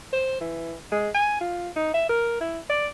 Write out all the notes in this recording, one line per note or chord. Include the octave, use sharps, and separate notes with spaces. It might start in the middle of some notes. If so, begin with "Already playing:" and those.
C5
E3
G#3
G#5
F4
D#4
E5
A#4
E4
D5